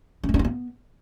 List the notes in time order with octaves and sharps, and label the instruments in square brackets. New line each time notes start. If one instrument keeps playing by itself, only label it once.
[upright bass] C#4
A3
D4
F4
B3